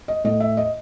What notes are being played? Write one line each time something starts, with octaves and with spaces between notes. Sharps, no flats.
D#5
A2 D#5
E5
D#5